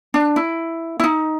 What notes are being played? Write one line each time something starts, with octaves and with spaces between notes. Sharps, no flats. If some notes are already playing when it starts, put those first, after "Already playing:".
D4
E4
E4
D#4